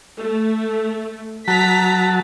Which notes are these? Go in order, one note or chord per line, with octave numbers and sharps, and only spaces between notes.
A3
F#3 A5 A#5 B6